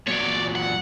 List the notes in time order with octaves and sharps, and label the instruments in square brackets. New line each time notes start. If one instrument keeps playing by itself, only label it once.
[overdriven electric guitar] A#2 F#3 [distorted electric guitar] C#5 D5
[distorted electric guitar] F#5